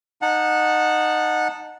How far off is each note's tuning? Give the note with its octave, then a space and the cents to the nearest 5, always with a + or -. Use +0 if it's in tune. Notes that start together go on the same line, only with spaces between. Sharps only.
D#4 -15 F#5 -15 A5 +0